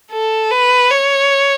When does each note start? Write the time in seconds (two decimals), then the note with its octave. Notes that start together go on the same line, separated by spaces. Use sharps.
0.11 A4
0.51 B4
0.91 C#5